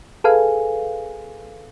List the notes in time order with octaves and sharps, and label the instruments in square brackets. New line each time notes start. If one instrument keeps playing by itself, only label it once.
[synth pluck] G#4 A4 B4 F5 G#5